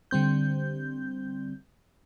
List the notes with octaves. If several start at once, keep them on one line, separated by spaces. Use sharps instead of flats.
D3 G3 C4 G6